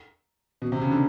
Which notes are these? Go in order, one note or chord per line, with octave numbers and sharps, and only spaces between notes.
B2
C3
C#3
D3